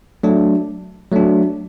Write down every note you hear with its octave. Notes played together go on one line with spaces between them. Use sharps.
F#3 A3 D4
F#3 A3 D4